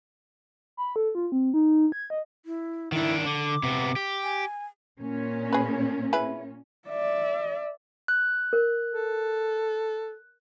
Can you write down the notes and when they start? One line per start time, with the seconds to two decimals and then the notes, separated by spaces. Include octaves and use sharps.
0.77 B5
0.96 A4
1.15 F4
1.32 C4
1.54 D#4
1.92 G#6
2.10 D#5
2.46 E4
2.92 D#3 D4 E4
3.26 D3 D6
3.63 C3 B3
3.96 G4
4.23 G#5
5.00 A#2 C#4
5.53 G#4 B4
6.13 E4 G#4 B4
6.88 D5 E5
8.08 F#6
8.53 A#4
8.92 A4